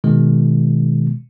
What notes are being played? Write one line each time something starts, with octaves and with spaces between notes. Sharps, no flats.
B2 D#3 G#3